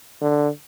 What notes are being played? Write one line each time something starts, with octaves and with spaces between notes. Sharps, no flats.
D3